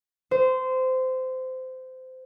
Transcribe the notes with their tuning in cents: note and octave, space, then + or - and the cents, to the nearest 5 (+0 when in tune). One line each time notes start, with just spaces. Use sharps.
C5 -20